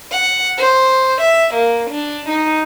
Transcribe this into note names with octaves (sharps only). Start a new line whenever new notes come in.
F#5
C5
E5
A#3
D4
D#4